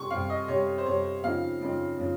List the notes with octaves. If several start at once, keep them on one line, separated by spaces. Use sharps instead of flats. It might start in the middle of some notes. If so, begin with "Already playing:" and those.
Already playing: C3 G3 C4 C6 C#6
C3 G3 C4 F5
D#5
C3 G3 C4 C#5
C5
C3 G3 C4 C#5
C#3 F3 C4 D#4 F5
C#3 F3 C4 D#4
C#3 F3